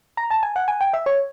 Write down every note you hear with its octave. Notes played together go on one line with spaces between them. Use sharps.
A#5
A5
G#5
F#5
G#5
G5
E5
C#5